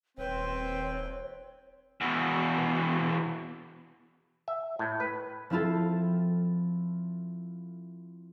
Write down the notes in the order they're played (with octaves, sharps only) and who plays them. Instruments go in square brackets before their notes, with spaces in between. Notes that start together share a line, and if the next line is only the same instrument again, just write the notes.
[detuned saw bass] D#1 [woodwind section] C4 [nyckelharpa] B4 G5 [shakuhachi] C#5
[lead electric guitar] E2 B2
[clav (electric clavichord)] E5
A2
B4
[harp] F3 C4 E4 F4 A4